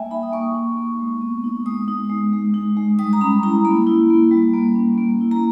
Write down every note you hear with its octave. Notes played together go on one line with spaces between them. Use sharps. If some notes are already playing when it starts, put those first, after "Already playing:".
Already playing: G3 A#3 E5 G5 G#5
D#4 B5
D#6
A#3 C#6
D#4
A#3
G#3
B3
D#4
G#3 D#6
D#4
G#3
G#3
D#4
G#3
G3 D#6
A#5
C#4 B5
E4 A#5
A#3 B5
E4
A#3
G3
A#3
C#4
A#3
E4
A#5